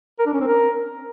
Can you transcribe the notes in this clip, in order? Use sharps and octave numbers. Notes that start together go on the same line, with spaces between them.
A#4
D4
C#4
C4
A#4